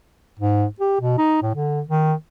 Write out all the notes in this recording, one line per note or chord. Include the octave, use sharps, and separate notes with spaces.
G#2
G4
B2
D#4
A2
D3
D#3